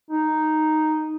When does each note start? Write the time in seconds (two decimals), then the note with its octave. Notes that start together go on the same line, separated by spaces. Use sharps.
0.10 D#4